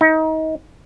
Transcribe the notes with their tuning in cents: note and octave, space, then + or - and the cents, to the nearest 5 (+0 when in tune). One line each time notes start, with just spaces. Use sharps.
D#4 +30